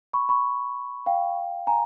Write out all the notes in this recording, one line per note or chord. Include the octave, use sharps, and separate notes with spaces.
B5 C#6
B5 C#6
F5 G5
G#5 A#5